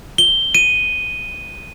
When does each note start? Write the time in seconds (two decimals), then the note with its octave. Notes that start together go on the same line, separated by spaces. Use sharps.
0.18 G7
0.55 D#7